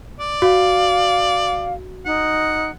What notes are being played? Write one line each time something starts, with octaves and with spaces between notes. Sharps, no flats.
D5
F#4 F5
D#4 F#5